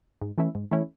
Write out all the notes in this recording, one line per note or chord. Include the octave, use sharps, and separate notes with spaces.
G#2
E3 A3 C#4 E4
G#2
E3 A3 C#4 E4